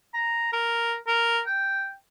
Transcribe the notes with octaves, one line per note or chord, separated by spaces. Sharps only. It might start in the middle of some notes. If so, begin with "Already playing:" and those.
A#5
A#4
A#4
G5